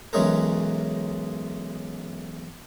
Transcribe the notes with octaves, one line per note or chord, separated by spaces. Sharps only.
B1 E3 G#3 C#4 G#4 A#4